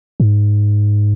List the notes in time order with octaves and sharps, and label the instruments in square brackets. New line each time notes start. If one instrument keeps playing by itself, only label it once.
[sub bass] G#2